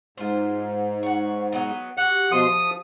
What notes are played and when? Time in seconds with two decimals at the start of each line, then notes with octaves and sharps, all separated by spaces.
0.18 G#2 F4 C5
1.03 C#5 F#5
1.52 F#3 B3 D#4
1.97 F#4 G4 F#5
2.32 B2 F3 A3 C6 D#6
2.50 F3